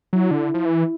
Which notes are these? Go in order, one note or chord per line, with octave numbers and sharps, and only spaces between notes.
F#3 E4
D3
F3
E3